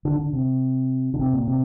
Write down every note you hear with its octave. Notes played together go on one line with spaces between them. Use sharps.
D3
D3
C3
D3
C3
A#2
C3